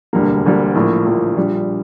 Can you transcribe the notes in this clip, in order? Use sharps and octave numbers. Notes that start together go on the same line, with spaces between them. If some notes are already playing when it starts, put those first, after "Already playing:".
E1 D2 D3 G3 A#3
E1 D2 D3 G3 A#3
A#1 A2 F3 A#3
A#1 A2 F3 A#3
A#1 A#2 G3 D4